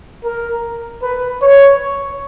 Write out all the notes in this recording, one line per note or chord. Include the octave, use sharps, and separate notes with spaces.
A#4
B4
C#5